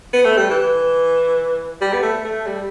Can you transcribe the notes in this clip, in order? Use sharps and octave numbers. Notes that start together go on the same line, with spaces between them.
B3
A3
G3
E3
G3
B3
A3
A3
G3